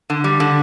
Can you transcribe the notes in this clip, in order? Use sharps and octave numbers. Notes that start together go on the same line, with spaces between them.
D3
G3
D3